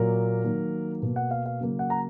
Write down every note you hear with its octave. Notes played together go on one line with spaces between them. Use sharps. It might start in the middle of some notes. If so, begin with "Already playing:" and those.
Already playing: A#2 F#3 A#3 A#4
D#3 F#3 A#3
B2 A#3
F#5
F5
F5
C#3 F#3 A#3
F#5
A#5